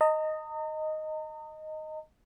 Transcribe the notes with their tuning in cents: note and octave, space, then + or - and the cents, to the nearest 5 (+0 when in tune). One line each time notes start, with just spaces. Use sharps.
D#5 +0 A#5 -40